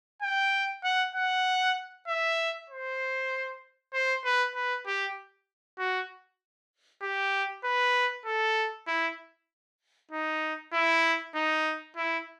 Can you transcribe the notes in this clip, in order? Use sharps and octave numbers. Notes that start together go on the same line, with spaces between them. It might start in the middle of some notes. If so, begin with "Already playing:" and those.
G5
F#5
F#5
E5
C5
C5
B4
B4
G4
F#4
G4
B4
A4
E4
D#4
E4
D#4
E4